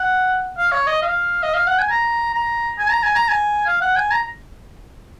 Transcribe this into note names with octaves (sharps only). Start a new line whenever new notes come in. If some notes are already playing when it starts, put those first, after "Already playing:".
Already playing: F#5
F5
C#5
D#5
F5
D#5
F5
F#5
G#5
A#5
A#5
G#5
A#5
G#5
A#5
G#5
F5
F#5
G#5
A#5